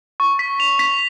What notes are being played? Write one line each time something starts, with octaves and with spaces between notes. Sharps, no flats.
C#6
B6
F7
B6